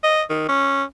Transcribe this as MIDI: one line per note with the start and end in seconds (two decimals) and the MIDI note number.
0.04 0.22 75
0.30 0.45 51
0.49 0.83 61